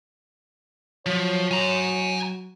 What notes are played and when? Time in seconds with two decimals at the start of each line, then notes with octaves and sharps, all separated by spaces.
1.06 F3 F#3 C#5
1.51 G#5 A#5